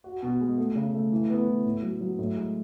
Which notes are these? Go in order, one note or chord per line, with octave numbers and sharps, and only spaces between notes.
F#4
B2
G#3
A3
C#3
A3
E3
B3
E3
A2
F#3
F#3
A2
G#3